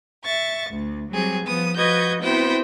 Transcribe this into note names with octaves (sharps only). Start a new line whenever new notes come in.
E5 C#6 A6
D2
F#3 G3 C4 G#4
F3 B3 D#6
F3 F#4 B4 D#5 G6 G#6
B3 C4 E4 F#4 C5 G5